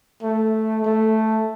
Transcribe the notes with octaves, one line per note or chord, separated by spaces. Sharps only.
A3
A3